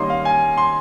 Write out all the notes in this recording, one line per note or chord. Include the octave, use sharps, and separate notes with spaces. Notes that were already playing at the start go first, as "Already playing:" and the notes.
Already playing: D#3 G3 A#3 C#4 D#5 C6
F5
G#5
C6